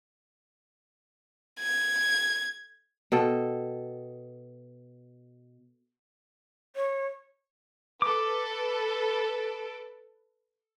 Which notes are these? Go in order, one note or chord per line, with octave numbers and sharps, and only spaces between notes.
G#6
B2 A4 G5
C#5
A4 B4 D6